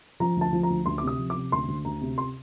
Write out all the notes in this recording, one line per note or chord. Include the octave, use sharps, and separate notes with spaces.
F3 A#5
D2 A5
F3
A#5
D2
D2 C6
D6
C3 D#6
F3
D6
C3
D2 C6
D2
D2 A#5
C3
C6